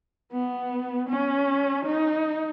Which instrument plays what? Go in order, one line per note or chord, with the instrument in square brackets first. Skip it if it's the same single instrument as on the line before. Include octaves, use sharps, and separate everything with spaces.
[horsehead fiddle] B3
C#4
D#4